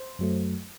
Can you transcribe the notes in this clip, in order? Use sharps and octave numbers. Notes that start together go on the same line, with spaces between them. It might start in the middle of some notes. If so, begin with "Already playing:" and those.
Already playing: C5
F#2 F#3 A3